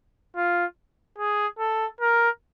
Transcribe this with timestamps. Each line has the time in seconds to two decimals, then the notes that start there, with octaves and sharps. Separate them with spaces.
0.36 F4
1.18 G#4
1.59 A4
2.01 A#4